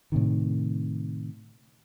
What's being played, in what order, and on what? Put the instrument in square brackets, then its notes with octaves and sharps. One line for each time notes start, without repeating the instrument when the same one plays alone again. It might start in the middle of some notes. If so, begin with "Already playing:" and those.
[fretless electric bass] A2 C3 D#3